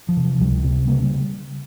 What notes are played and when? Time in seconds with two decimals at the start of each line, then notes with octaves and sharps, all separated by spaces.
0.09 F3
0.17 C3
0.24 F3
0.41 C#2 G3
0.64 C3
0.87 C#3 A#3
1.03 G3